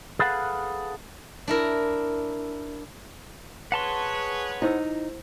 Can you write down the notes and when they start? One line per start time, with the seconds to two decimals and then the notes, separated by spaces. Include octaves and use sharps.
0.19 G#4 A4 B4 F5 F#5
1.48 D4 E4 A#4
3.72 G#4 B4 C#5 F#5 A5 C6
4.62 D#4 E4 C5 E6